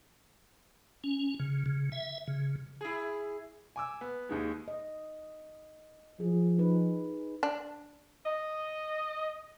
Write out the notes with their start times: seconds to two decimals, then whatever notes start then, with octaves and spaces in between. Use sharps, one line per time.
1.04 C#4
1.40 C#3
1.66 C#3
1.92 E5
2.28 C#3
2.81 E4 G#4
3.76 G#5 D6 E6
4.01 B3
4.29 D#2 D#3 G#3
4.68 D#5
6.20 F3 G#4
6.58 D#4 B4
7.43 D4
8.25 D#5